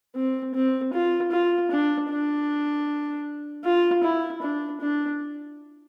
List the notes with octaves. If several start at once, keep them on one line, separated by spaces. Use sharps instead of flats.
C4
C4
F4
F4
D4
D4
F4
E4
D4
D4